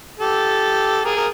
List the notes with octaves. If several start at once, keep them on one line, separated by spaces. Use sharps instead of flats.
G4 A4
G#4 A#4
A#4